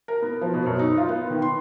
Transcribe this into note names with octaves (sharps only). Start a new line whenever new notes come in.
A#4
B3
F3
B2
F#2
D#4
F4
B3
D#3
C6